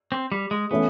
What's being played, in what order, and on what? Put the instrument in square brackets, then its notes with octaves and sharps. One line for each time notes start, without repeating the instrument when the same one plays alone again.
[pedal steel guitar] C4
G3
G#3
[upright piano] E3 A3 C#4 E4 [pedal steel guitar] B3